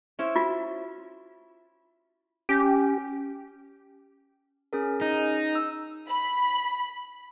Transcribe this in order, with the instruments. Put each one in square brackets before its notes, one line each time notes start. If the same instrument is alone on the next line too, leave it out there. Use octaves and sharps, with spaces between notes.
[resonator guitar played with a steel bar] C#4 E4 C5
[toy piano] F4 F#4
[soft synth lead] C#4 [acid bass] G4
[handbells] C#4 G#4 A#4
[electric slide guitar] D#4
[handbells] E6
[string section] B5